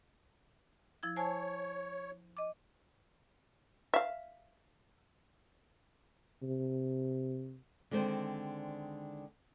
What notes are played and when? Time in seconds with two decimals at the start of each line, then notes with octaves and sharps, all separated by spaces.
1.03 F3 E4 G#6
1.16 C5 C#5 G#5 A5
2.37 D#5 D6
3.94 E5 F5
6.43 C3
7.91 D3 D#3 G#3 C4 D4 C5